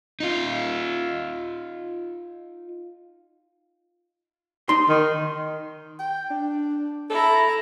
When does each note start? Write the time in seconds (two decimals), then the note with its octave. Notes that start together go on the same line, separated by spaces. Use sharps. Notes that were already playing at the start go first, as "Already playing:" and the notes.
0.20 D#4 F4
4.69 D#4 C6
4.89 D#3
5.99 G5
6.30 D4
7.10 E4 A4 A#5